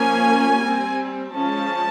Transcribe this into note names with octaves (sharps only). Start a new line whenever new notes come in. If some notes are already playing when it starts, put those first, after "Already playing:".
Already playing: F3 A#3 C#4 G#5
G3 C4
F3 G#3 C#4 A5